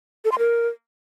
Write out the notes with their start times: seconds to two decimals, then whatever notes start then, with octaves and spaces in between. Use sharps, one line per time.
0.25 A4
0.32 C6
0.39 A#4